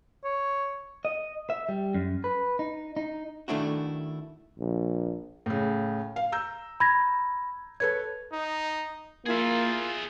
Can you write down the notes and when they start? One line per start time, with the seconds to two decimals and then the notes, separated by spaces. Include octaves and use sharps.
0.24 C#5
1.05 D#5
1.50 E5
1.69 G3
1.95 F#2
2.24 B4
2.59 D#4
2.97 D#4
3.48 D#3 A3 D4 E4 F#4
4.59 A#1
5.46 A2 C#3
6.16 F5
6.32 A#5 E6 G6
6.80 B5 G#6 A#6
7.80 A4 B4 C#5 G#6
8.33 D#4
9.26 A#3 E4 F4 G#4 E5